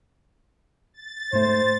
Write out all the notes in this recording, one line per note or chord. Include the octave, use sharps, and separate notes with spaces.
A6
G#2 A3 C5